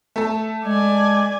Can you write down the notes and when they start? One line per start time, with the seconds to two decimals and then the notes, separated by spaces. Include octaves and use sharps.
0.16 A3 A4
0.65 G#3 D5 G#5